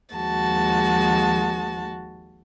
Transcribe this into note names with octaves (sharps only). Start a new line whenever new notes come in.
D#2 F3 G#3 F#4 A5